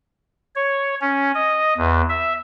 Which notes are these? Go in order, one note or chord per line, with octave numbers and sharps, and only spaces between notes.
C#5
C#4
D#5
E2
E5